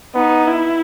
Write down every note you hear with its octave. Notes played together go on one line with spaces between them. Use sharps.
B3 D#4
E4